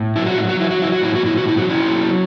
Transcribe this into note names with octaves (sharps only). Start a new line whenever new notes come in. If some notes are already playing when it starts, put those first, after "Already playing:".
Already playing: A2
F#3 E4
F#4
E4
F#3
F#4
E4
F#3 F#4
E4
F#4
A2 E4
F#4
A2 E4
F#4
E4
F#3 F#4
C#4 E4
F#3